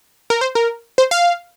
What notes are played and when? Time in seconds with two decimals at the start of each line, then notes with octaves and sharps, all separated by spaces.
0.30 A#4
0.41 C5
0.55 A#4
0.98 C5
1.11 F5